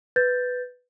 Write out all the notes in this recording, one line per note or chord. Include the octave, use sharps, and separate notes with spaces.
B4 G6 A6